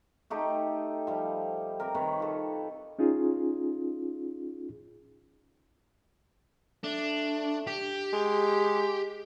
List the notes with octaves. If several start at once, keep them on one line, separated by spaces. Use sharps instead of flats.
A3 D#4 G4 A4
F3 G3
C4 G4 A#4
C3 D#3 B4 C#5
F4 A4
C#4 D#4 F4 G#4
A3 D4
G4
G#3